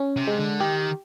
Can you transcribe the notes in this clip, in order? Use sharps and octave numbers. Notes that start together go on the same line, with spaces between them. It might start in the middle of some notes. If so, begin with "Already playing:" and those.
Already playing: C#4
C3
G#3
D3
D#3 G4